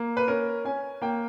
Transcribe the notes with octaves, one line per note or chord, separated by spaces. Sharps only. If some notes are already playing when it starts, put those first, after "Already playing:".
Already playing: A#3
B4
C#4 A#4
C#4 G#5
A#3 G5